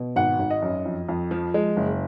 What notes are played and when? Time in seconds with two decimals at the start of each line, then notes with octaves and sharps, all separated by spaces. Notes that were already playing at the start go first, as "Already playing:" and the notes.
Already playing: B2
0.16 G#1 F#5
0.40 G#1
0.50 D#5
0.62 F#2
0.85 F2
1.09 F2
1.31 F3
1.54 G#3
1.77 F#1